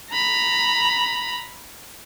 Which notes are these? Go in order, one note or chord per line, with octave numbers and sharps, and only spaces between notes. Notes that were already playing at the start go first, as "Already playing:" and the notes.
A#5 B5